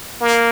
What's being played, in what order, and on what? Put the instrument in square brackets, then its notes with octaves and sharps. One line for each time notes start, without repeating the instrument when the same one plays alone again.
[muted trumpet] A#3